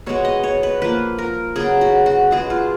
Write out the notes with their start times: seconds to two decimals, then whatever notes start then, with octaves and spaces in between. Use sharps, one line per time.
0.06 B2 G#3 B3 C#5
0.25 D#5
0.43 C#5
0.63 B4
0.82 F3 A#3 B4
1.18 A#4
1.56 C#3 F#3 B3 G#4
1.81 F#4
2.06 F#4
2.31 B2 G#3 B3 G#4
2.50 F4